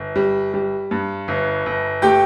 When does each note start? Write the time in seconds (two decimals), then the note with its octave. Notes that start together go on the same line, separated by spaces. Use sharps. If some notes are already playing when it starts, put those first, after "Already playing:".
Already playing: G1
0.16 G3
0.54 G3
0.91 G2
1.28 G1
1.66 G1
2.02 A3 G4 G5